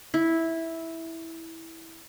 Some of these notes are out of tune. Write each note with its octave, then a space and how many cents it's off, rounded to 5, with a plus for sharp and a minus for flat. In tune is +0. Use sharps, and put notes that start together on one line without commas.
E4 -10